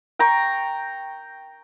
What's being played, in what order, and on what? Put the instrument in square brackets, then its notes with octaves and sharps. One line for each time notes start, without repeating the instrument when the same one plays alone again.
[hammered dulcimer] G5 A#5 C#6